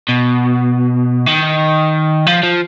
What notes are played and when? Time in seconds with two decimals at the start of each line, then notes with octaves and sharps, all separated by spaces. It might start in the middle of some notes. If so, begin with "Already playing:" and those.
0.09 B2
1.26 D#3
2.27 F3
2.43 F3